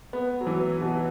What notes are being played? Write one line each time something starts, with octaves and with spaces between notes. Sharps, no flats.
B3
F#3
E3
B2